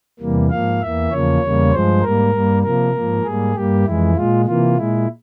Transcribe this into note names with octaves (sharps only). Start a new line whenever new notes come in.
E2 C3 E3 G3 A#3
G#2 F3 A#3 F5
E2 E3 A#3 E5
E2 C#3 F3 A#3 C#5
E2 C#3 G3 A#3
G2 F3 G#3 C5
G#2 G3 A#3 A#4
G2 G3 A#3
C3 F3 A#3 A#4
G#2 F3 A#3
G#2 G3 A#3 G#4
G2 G3 A#3 G4
F2 E3 G#3 E4
A#2 G#3 F4
C3 E3 A#3 F4
A#2 G#3 E4